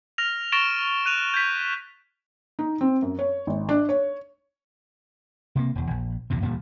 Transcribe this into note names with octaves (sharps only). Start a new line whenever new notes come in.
F6 A#6 F7
C#6 A6 A#6 D7 E7 G7
F#6 D#7 F7
G6 G#6 B6
D#4
C4
F#2
C#5
G#1
D4
C#5
C3 A3 A#3
E1 E2
A#1
A#1 E2 G2 C3
E1 D2 A#2 G3